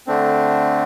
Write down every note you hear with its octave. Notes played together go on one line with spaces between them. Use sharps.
D3 A3 C4 D4